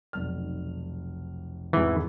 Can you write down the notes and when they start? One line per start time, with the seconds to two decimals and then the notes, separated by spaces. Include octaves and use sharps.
0.13 F1 B1 F6
1.73 E2 G#2 C3 E3